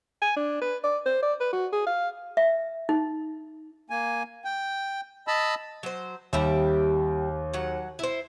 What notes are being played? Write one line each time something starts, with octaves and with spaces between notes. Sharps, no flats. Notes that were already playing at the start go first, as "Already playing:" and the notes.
G#5
D4
B4
D5
C5
D5
B4
F#4
G#4
F5
E5
D#4
A#3 G#5
G5
D#5 A5 B5 E6
F#3 C5
D#2 G3 G4 E5
F#3 F#5
E4 C5